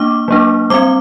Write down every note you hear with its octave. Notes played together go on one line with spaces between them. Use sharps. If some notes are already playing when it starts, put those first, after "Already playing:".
Already playing: A#3 D4 D6
F#3 A#3 D4
G3 C4 D6